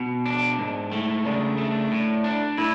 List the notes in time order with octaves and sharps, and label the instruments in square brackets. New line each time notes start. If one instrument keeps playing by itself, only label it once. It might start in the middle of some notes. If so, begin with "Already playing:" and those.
Already playing: [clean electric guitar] B2
D4
G#2
A3
[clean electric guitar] C#3 [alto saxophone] D4
[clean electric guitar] A3
A2
D4
[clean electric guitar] A2 [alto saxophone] E4